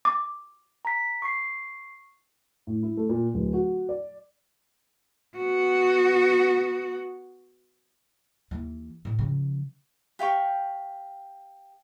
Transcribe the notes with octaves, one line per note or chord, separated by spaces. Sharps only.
D6
A#5 B6
C#6 C7
A2
E4
A3
A#2
D1
F#4
D5
B3 F#4
D#2 E3
A2
C#3 F3
G4 F5 G5 C#6